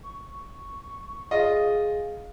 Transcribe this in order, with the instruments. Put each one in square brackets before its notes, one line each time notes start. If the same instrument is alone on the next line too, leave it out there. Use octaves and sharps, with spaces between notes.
[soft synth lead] C#6
[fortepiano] F4 D#5 [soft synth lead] G#4